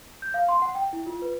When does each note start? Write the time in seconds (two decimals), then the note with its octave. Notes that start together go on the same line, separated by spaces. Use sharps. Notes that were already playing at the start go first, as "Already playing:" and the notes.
0.22 G6
0.34 F5
0.49 C6
0.62 F#5
0.75 G5
0.93 E4
1.06 F4
1.22 B4